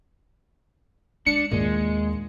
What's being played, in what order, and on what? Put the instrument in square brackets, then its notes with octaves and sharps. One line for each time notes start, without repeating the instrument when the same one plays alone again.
[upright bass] G#3 [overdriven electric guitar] D4 [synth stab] C#7
[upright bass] D#2 [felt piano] A#2 [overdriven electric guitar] G#3